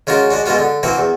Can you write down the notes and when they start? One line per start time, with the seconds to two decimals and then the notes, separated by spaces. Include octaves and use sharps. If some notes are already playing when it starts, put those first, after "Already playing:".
0.07 C#3 G#3 F4 F#4 A#4
0.31 G#3 D4 F#4
0.46 B2 G#3 B3 F4 F#4
0.58 D3
0.83 E3 A#3 C4 F#4
0.98 E2